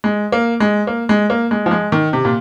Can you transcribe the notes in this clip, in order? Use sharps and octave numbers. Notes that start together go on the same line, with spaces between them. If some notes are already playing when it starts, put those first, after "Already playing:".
G#3
A#3
G#3
A#3
G#3
A#3
G#3
F3
G#3
D#3
C3
A#2